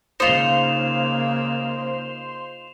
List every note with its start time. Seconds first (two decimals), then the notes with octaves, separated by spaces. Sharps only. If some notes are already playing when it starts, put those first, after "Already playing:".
0.20 C#3 A#3 D#4 F4 C5 C6 E7 F7